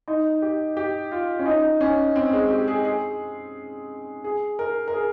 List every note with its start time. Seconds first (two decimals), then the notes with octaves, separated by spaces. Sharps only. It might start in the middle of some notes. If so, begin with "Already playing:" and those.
0.08 D#4
0.42 G4
0.77 G4
1.12 F4
1.39 C#4
1.46 D#4
1.81 C#4
2.16 C4
2.33 G#3
2.50 G4
2.68 G#4
2.85 G#4
4.24 G#4
4.59 A#4
4.88 A#4
4.93 G#4